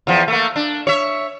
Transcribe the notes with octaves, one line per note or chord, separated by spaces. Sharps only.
E2 F3
A3 A#3
D4
C#5 E5